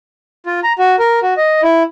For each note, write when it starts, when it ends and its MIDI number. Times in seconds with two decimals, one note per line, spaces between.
0.46 0.60 65
0.64 0.73 82
0.79 0.96 66
0.99 1.20 70
1.22 1.34 66
1.37 1.61 75
1.63 1.83 64